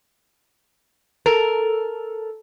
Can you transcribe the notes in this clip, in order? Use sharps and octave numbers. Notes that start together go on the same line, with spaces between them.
A4 A#4